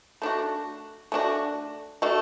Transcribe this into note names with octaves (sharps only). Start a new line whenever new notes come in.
A3 D4 F#4
A3 D4 F#4
A3 D4 F#4